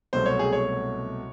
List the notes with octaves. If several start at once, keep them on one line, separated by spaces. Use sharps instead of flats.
C2 B2 F#3 A3 C5
C#5
G#4
C#5